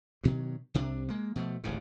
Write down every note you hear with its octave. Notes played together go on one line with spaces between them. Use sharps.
G2 B2 D#3 F#3
C2 C3 D4
G#3 A#3
B2 F3 A3
D1 A1 G#2 C#3